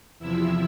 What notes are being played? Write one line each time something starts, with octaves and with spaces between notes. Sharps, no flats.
E2 C3 F3 E4 E5